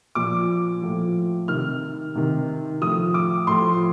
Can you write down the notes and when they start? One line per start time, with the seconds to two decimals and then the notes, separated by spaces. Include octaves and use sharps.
0.15 A#2 F3 D6
0.82 A2 F3
1.48 C3 D#3 F6
2.15 C3 D#3
2.81 A2 F3 D#6
3.14 D6
3.47 A2 F3 C6